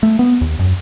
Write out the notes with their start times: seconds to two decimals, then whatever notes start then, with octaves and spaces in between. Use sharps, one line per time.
0.03 A3
0.19 B3
0.41 D#2
0.59 F#2